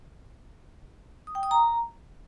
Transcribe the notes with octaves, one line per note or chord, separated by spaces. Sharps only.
D#6
G5
D#6
A#5